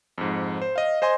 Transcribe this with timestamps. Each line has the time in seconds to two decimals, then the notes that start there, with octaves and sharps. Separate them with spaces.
0.18 F2 G#2
0.62 C5
0.76 D#5 F5
1.02 C5 D#5 G#5 C6